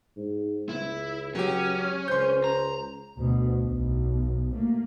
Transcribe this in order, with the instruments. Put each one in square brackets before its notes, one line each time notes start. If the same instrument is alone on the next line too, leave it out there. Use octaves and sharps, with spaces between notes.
[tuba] G#2
[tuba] C#2 [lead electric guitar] E4
[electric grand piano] F#3 G4 [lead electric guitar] C#4
[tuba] C#2 [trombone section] C5 [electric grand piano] C6 G6
[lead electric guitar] A#5
[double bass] D2 B2
B1
A3 A#3